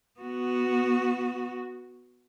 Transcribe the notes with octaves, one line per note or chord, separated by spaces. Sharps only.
B3 F#4